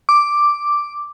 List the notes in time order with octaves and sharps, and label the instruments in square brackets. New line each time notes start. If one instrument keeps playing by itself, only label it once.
[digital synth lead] D6